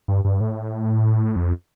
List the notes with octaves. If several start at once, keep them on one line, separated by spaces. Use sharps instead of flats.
G2
G2
A2
F2